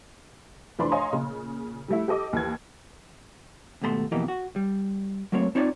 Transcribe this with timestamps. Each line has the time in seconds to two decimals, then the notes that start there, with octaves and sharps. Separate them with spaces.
0.79 F1 E3 F3 D4 B5 C6
0.91 C#5 D#5 F5 G#5 A#5 C6
1.13 A#2 C#3
1.88 G3 A3 E4
2.08 G4 A4 D#5 D6
2.33 D#2 E3 G#6
3.82 D#2 G#2 B2 A3 A#5 C6
4.12 F2 B2 E3 A#3 G4 D#5
4.28 F#4
4.56 G3
5.32 F#3 A3 A#3 C4 C#5
5.55 C4 D#4 F4 C#5 D5